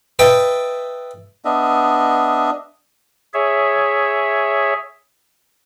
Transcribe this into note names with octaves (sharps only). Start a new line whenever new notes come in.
B4 D#5 E5 G5 A5
B3 D4 D#5 E5
G#4 C#5 E5